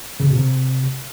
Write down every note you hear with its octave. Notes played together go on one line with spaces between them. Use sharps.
C#3
C3
B2
C3